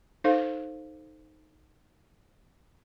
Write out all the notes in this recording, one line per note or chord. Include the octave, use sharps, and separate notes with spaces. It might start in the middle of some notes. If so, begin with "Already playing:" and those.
D#4 A4 C5 F5